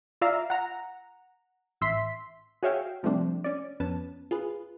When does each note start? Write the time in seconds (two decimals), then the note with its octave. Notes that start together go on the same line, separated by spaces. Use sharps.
0.21 F4 D5 E5 F5 A#5
0.50 F#5 A#5
1.81 A1 E5 C6 B6
2.63 F#4 G#4 C#5 E5 F5 G5
3.03 C3 F3 G3 A3 C4 D4
3.44 C#4 D5
3.80 F2 B3 C#4 A5
4.31 F4 G#4 B4